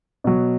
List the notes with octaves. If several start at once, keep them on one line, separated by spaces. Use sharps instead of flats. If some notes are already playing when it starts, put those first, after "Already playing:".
B2 F#3